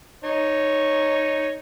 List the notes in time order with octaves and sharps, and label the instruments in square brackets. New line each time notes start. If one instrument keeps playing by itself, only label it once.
[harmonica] D#4 C#5